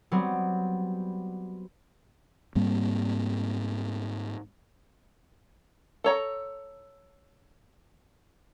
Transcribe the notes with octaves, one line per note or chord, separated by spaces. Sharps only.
F#3 G3 B3 C4
G#2 G3 A#3 C4
A4 C#5 A#5